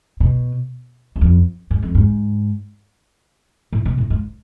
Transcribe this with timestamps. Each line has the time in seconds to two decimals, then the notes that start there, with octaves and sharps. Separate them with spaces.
0.20 B2
1.16 E2
1.21 F2
1.71 G#2
1.82 F2
1.95 G#2
3.73 A2
3.85 B2
3.98 A2
4.10 G#2